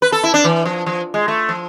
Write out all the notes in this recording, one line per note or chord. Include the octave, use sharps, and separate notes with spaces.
B4
A4
E4
D4
E3
F3
F3
G#3
A3
F3